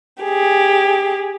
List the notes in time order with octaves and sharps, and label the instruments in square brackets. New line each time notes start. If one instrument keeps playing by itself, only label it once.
[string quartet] G4 G#4